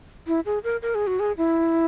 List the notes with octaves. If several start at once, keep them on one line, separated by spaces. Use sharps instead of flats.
E4
G#4
A#4
A#4
G#4
F#4
G#4
E4